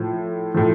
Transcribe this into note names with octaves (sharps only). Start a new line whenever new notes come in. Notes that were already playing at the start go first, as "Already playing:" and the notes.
Already playing: A2 F3
A2 F3